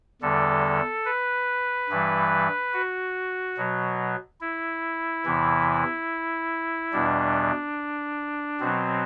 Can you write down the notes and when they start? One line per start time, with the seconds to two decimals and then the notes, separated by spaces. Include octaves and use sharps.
0.22 E2 D3 G3 A4
1.05 B4
1.89 G2 E3 G3
2.73 F#4
3.57 B2 F#3
4.41 E4
5.25 E2 C3 E3
6.93 E2 B2 G3 D4
8.60 B2 F#3 C4